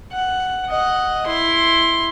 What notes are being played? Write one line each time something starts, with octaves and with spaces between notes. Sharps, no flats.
F#5
D#5 F#5
E4 C6